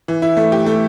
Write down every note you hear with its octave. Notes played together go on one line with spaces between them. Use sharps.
E3
E4
A3
G4
A3